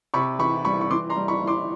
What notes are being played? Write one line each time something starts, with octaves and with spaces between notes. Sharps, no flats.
C3 B5 C#6
E3 B5 C#6
G3 B5 C#6
C#6
E3 C6 D6
A#5 C6
G3
B5 C#6
G3
C6 D6